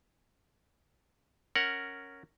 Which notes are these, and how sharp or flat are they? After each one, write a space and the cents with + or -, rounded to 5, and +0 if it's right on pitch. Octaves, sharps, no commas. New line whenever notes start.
C#4 +0 A#4 -5 F#5 +0